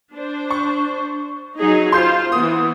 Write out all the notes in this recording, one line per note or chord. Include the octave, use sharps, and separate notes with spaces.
D4 C5
C#6
F#3 D#4 G#4
F4 C5 C6 G6 C7
E3 B3 D#6